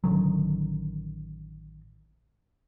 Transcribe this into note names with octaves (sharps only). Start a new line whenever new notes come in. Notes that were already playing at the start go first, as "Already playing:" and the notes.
A1 D3 D#3 F#3